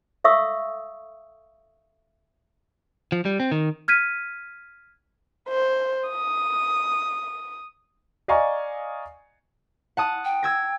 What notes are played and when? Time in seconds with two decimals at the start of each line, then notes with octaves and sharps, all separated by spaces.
0.24 A4 E5 F5 C#6 D#6 E6
3.12 F3
3.25 G3
3.40 C4
3.51 D#3
3.88 F6 G#6 B6 D#7
5.49 C5
6.08 D#6
8.28 D5 D#5 F5 G#5 A#5 C#6
9.97 F#5 A5 D#6
10.25 G5
10.43 E6 G#6 A#6